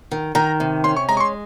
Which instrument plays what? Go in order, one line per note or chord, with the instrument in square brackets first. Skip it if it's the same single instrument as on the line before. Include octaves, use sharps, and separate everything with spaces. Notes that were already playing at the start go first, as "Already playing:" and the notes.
[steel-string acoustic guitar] D#3
[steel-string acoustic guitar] D#3 [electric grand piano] A#5
[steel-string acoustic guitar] C3
[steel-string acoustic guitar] C#4 [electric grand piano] C6
[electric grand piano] C#6
[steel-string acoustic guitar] G#3 [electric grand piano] A#5
[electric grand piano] C#6
C6